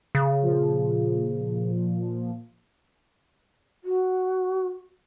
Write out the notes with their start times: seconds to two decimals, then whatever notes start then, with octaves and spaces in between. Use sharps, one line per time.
0.15 C#3
0.42 A#2 F3
3.84 F#4